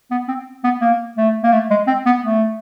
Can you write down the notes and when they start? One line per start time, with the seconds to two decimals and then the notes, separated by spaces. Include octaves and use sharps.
0.11 B3
0.28 C4
0.64 B3
0.81 A#3
1.17 A3
1.43 A#3
1.52 A3
1.70 G#3
1.87 C4
2.06 B3
2.22 A3